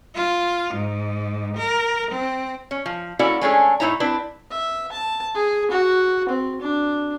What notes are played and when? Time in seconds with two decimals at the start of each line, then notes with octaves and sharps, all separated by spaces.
0.15 F4
0.74 G#2
1.57 A#4
2.12 C4
2.71 C#4
2.86 F3
3.19 A#3 C#4 E4 F#4 A4 D5
3.41 G#3 A3 C#4 D4 G#4 A4
3.80 A2 C4 D#4 E4 C#5 A#5
4.00 C4 D4 E4 B4
4.51 E5
4.92 A5
5.35 G#4
5.71 F#4
6.29 C4
6.61 D4